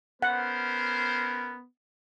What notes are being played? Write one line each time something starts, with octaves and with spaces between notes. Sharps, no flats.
B3 C#4 A#4 C5 F#5